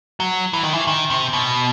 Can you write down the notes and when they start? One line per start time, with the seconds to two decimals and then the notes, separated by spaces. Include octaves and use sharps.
0.20 F#3
0.53 E3
0.63 D#3
0.73 E3
0.87 D#3
1.10 C3
1.33 B2